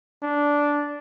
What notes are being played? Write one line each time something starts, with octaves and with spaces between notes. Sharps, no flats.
D4